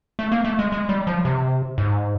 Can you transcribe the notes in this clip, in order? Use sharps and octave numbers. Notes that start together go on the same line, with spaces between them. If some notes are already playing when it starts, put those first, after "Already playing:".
A3
A#3
A3
G#3
G#3
G3
F3
C3
G#2